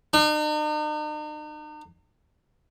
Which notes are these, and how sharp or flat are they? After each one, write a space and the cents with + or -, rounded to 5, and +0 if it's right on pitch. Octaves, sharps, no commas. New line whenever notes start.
D#4 -45